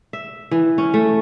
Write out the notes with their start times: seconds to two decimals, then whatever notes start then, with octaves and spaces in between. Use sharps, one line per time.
0.13 E5
0.51 E3
0.78 C#4
0.94 A3